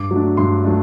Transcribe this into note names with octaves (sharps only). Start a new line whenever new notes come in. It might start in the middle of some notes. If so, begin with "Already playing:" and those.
Already playing: G2 D6
F#3 A3 D4
G2 C6
F#3 A3 D4